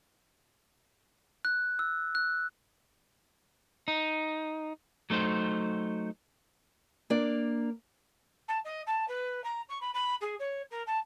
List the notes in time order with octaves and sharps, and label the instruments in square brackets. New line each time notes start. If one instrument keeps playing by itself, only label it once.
[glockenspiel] F#6
E6
F#6
[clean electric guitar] D#4
F#3 A3 D#4 C5
[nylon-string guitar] A#3 D4 D5
[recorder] A5
D#5
A5
B4
A#5
C#6
B5
B5
G#4
C#5
A#4
A5